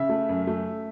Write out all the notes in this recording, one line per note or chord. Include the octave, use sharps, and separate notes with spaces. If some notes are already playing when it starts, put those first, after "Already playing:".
Already playing: C#3 E5
A3
F#2
A3